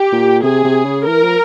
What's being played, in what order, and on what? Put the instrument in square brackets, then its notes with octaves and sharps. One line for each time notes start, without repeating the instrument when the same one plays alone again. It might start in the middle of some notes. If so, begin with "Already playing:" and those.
Already playing: [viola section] G4
[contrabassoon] A#2
[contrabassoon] C3 [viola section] G#4
[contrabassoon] C3
C#3
[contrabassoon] E3 [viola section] A#4
[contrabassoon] F3